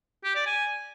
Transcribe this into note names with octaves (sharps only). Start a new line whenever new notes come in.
G4
D5
G#5